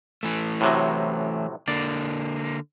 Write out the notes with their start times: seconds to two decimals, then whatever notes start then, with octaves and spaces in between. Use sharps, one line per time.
0.23 E3 A3
0.61 A2 C3 F#3
1.68 D3 A#3 D5